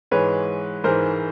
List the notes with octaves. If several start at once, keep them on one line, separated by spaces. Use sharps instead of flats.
G#2 E3 G#3 B4 C#5
G#2 E3 G#3 A#4 C5